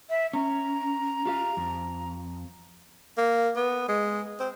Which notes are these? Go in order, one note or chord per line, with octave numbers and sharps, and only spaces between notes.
E5
C#4 A#5
F4 G4 F5
F2
A#3
B3
G#3
C4